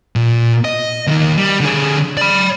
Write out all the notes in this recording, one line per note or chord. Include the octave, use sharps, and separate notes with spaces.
A#2
D#5
D#2 D#3
G3
D3 G#4
D5 B5